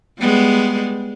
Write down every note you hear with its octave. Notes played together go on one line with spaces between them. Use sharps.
G3 G#3 B3